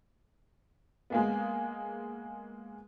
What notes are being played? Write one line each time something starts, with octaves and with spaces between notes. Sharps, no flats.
G#3 A#3 B3